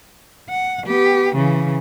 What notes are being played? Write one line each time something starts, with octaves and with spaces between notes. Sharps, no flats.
F#5
B3 G4
C#3 E3